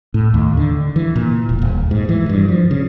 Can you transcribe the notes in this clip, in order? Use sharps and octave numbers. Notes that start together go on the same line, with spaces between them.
A2
D#2
D3
E3
A#2
E1
D#1
G#2
E3
G2
F3
C#3